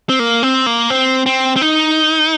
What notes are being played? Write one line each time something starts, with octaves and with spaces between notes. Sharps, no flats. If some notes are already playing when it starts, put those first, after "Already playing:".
C4
A#3
C4
A#3
C4
C4
C4
D#4